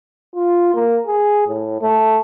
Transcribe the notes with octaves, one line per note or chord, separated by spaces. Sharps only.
F4
A#3
G#4
A2
A3